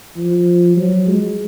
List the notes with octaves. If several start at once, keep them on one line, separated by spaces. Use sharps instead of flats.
F3
F#3
G#3